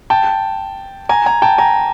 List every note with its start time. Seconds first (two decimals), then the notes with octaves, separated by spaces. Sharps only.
0.10 G5 A5
1.09 G#5 A#5
1.26 G#5 A#5
1.42 G5 A5
1.58 G#5 A#5